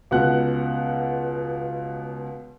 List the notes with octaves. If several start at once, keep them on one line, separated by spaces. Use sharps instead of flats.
C#2 B2 F#5 F#6